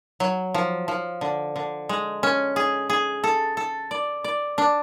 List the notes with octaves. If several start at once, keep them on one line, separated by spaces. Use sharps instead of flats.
F#3
F3
F3
D3
D3
G#3
C#4
G#4
G#4
A4
A4
D5
D5
D4